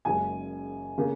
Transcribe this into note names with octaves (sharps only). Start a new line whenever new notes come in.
F#1 F#2 C#3 G#3 G#5
C#3 A#3